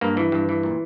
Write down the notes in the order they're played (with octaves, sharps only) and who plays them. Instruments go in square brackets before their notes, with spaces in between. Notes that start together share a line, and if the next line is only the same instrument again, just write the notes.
[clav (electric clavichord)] G2 A#3
E3
G2
E3
A#2